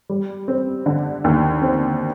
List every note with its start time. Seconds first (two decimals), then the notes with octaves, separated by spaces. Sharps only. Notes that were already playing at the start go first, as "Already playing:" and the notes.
0.09 G3
0.48 C4
0.86 D3
1.24 D#2
1.62 C4